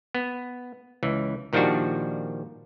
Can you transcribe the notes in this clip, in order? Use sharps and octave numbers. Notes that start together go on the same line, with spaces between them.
B3
C#2 E3
A#2 D#3 F3 G3 D4 F#4